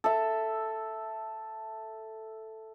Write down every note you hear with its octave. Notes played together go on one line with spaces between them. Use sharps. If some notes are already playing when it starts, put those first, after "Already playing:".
A4 E5